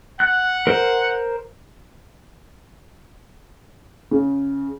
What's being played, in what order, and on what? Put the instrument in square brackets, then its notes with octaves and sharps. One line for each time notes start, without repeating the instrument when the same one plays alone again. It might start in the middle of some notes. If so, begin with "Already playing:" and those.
[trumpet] F#5 [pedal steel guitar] F#6
[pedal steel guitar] A#4 C5
[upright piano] C#3